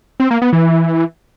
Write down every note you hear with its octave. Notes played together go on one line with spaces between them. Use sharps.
C4
A#3
B3
E3